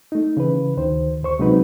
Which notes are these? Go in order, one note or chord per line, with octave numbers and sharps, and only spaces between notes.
A3 D#4
C#3 E3 B4
D2 D#3 C5
D2 C5 C#6
C3 F#3 G#3 C4 D#4 B4